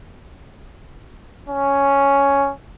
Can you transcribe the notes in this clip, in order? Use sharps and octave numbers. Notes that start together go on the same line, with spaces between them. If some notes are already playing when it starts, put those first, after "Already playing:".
C#4